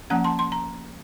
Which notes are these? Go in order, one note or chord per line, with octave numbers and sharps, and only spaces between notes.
F3 A#3 C#4 F#5 A#5
A5 C6
C6
A#5